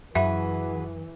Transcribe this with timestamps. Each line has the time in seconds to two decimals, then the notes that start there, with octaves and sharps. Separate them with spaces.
0.15 F#2 E3 F#4 G#4 B4 E5